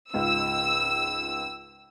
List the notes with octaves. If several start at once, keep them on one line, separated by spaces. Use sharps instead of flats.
C#2 G#2 F4 E6